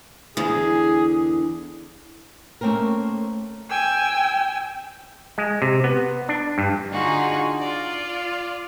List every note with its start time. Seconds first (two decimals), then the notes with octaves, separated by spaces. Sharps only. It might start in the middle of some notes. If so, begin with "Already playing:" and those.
0.37 E2 D3 G#4
2.61 A3 A#3 C4 C#4 A#4
3.69 G5 G#5 E6
5.38 G#3
5.62 C3
5.84 B3
6.29 D4
6.58 G2
6.91 D3 D4 D#4 F4 F#4 G#4
7.60 F4 D5